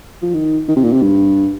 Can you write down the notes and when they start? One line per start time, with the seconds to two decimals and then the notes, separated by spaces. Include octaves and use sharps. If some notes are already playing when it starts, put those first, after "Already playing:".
0.22 F3
0.34 D#3
0.68 D#3
0.76 C3
0.84 A#2
0.93 C3
1.02 G2